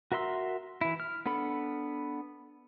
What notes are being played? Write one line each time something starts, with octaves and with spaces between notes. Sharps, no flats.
F#4 A#4 E5 C6 E6
E3 E4
F6
B3 D4 A4 B5